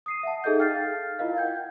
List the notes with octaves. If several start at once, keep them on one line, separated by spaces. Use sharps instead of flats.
D#6 C7 D#7
E5 F#5 A5
D#4 G#4 A4 D#5 G6
F5 G5 F6 G6 A6 C7
E4 F4 A#4 D#5 F5
F#5 G5 G6 G#6